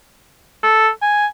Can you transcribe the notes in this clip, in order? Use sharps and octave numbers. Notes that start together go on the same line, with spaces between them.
A4
G#5